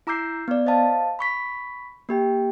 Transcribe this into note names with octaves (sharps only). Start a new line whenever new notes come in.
E4 A#5 D6 E6 G6 C7
B3 D5
C5 D#5 F5 A5
B5 C#6 B6
A#3 G4 G5